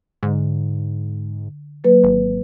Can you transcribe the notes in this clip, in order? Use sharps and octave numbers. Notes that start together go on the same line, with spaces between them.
G#2 D3
F#3 A#3 B4
G#1